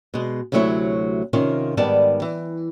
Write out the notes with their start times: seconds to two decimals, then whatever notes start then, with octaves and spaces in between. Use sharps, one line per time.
0.14 B2 G#3
0.52 D2 C3 F#3 A3 E4 C#5
1.33 C3 D#3 C#4 F4
1.77 G#2 D#3 G3 B3 D5 A5
2.22 E3